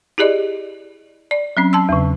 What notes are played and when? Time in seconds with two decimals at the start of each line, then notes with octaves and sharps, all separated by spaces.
0.18 E4 G4 G#4 D5 D#5
1.31 D5
1.57 F#3 C4 C#4
1.73 A5 C6 E6
1.89 E2 C#3